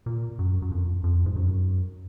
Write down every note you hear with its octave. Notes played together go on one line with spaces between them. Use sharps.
A#2
F#2
F#2
F2
F2
G#2
F#2